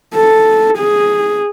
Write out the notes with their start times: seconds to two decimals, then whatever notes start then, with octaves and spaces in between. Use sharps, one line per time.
0.15 A4
0.78 G#4